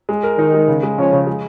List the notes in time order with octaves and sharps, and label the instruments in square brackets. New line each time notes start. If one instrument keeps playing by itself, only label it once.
[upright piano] G#3
A#4
[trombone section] D#3 [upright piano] D#4
[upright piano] G#3
C#3
G#3
[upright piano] F3 [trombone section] C#4
[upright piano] C#3
G#3